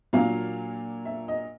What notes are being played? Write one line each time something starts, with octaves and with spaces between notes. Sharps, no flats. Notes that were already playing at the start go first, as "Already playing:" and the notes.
A#2 F#3 A#3 D4 F5
E5
D#5